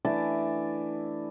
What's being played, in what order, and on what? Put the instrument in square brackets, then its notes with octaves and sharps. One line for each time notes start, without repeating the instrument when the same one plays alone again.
[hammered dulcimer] E3 A3 D4 A5